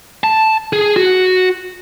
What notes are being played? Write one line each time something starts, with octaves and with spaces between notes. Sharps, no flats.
A5
G#4
F#4